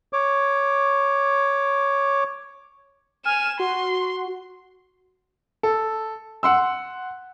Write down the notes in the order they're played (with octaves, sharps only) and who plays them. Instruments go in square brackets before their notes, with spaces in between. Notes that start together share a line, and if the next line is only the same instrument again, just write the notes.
[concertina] C#5 D6
[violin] G#5 E7 [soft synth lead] F6
[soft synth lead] F#4 [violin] C6
[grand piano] A4
F#5 C6 E6